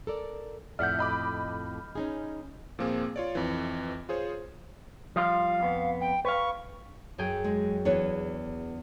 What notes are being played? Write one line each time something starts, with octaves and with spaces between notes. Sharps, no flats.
A4 A#4 D5
F2 A2 D5 E5 F#5 F6 G6
D#5 B5 D6
C#4 D#4 G#4
A#2 F3 A#3 C4 G#4
F4 C#5 D5
F2 E3
F4 G#4 C5 C#5
F3 G3 F4 F5
F2 B3
G5
B4 F5 C#6
F#2 G#4 G5
G#3
E2 B3 D4 B4 C#5